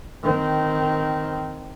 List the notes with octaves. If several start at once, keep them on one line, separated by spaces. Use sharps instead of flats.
D#3 C4